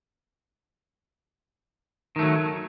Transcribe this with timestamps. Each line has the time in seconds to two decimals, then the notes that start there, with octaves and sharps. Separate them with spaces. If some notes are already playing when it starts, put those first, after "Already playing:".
2.16 D#3
2.19 A3
2.22 F#3